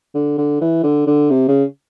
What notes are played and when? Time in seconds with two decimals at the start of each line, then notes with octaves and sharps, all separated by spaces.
0.15 D3
0.38 D3
0.61 E3
0.84 D3
1.07 D3
1.31 C3
1.48 C#3